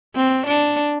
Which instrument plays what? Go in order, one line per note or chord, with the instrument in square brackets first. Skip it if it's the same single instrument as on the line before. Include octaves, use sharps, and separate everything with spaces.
[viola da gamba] C4
D4